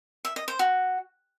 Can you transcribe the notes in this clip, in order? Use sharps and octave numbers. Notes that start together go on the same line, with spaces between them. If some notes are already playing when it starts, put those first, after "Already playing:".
E5
D#5
C5
F#4